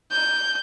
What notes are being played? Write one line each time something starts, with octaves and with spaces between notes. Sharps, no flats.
G6